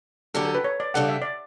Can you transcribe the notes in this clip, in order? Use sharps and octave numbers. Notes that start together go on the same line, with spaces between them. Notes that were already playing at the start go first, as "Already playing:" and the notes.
D3 F#3 C#4 G4 A4
A4
B4
C#5
D5
C#3 G3 D4 A4 F#5
E5
D5